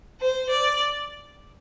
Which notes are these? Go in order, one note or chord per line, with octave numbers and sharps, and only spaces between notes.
C5
D5